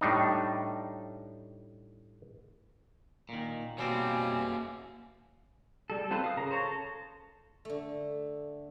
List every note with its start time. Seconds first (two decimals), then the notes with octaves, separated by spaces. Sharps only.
0.01 A2 G3 D4 D#4
3.29 A#2 D#3
3.78 B2 G3 A#3 C4 F#4 C#5 G#5
5.90 G3 A4
6.10 C4 F4 A4 B4 C5
6.24 F5 D#6
6.37 C#3 A#4 A#5
6.51 C5 C#5 A#5
6.63 A4
7.65 D3 A3